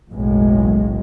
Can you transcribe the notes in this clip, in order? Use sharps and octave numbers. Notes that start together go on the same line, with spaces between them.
F#1 B1 A2 G#3